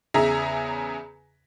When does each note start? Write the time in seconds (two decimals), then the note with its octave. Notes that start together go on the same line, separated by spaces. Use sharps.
0.14 E2 C#3 G#4 E5 A#5